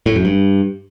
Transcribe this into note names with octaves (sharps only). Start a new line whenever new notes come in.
A2
F#2
G2